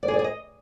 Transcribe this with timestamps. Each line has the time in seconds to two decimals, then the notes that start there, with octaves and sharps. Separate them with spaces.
0.03 D5
0.08 G#4
0.14 D5
0.19 G#4
0.24 D#5